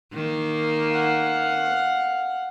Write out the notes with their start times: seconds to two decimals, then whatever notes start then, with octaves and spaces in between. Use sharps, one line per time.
0.13 D#3 A#3
0.92 F5 F#5